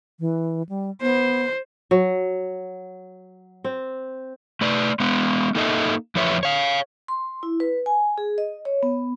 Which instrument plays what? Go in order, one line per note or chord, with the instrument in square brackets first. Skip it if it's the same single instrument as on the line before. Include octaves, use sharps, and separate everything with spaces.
[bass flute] E3
G3
[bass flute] B3 [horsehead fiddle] C5
[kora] F#3
C4
[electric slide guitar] A3 B4 D5
G#3 B3
A#3 D#4 A4 D#5 E5
E2 F3 B4 C#5 E5
C#5 F5
[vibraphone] C6
E4
B4
G#5
G#4
D#5
C#5
B3